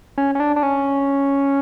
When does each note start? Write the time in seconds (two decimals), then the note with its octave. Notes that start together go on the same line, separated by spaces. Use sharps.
0.18 C#4
0.35 C#4
0.40 D4
0.56 D4
0.63 C#4